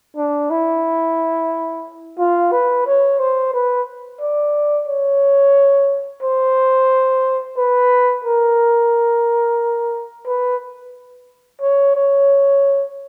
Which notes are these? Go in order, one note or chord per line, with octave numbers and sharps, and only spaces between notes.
D4
E4
F4
B4
C#5
C5
B4
D5
C#5
C5
B4
A#4
B4
C#5
C#5